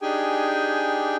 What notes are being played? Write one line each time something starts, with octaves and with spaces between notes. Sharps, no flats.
D4 D#4 G4 G#4 G5 G#5